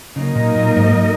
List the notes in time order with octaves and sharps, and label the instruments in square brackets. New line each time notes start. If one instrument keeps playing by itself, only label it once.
[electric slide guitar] C#3 [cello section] F#3 A#3 D#4 A#4 D#5
[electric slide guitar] A#2
A#2
G#2